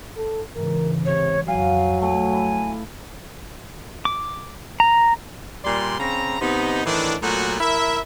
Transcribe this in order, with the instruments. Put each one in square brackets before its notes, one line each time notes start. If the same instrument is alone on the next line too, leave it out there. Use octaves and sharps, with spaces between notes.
[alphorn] A4
[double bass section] G#2 C#3 E3 [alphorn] A#4
[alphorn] C3 [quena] C#5
[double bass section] F2 [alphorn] F#3 [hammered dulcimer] F5 [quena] G#5
[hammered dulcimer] A3 [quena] G#5
[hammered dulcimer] E4
[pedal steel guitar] D6
A#5
[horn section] A#2 G3 D5 C6
C#3 C4 A#5
C3 B3 D#4
A2 D#3 E3 D4
A#2 F#3 A3 B3 F#4
E4 A#4 E5